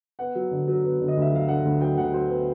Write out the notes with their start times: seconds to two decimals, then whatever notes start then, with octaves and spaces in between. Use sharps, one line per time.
0.19 B3 F#5
0.35 F#3
0.51 D3
0.68 F#3
0.84 B3
1.00 D3
1.08 D#5
1.17 D2 E5
1.33 F#3 F5
1.48 D3 F#5
1.65 D2
1.81 F#3 G5
1.98 D2 F#5
2.13 F#3 C5
2.30 B3